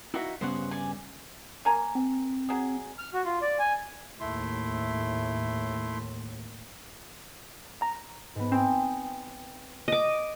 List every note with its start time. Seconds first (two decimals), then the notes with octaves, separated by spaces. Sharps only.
0.14 D#4 E4 F#4 E5 F5
0.41 G2 C#3 B3 C5 C#5 F#5
0.71 D5 G#5
1.65 A#3 G#5 A#5
1.95 C4
2.49 F#3 G#4
2.98 F6
3.14 F#4
3.25 F4
3.41 D5
3.59 G#5
4.20 D#2 A2 A3 E4 C6
7.82 A#5
8.35 G#2 B3
8.52 C4 G5 G#5 D#6
9.88 D#5 D6